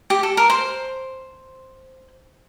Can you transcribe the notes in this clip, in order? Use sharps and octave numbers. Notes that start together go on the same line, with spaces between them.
G4
A4
A#4
C5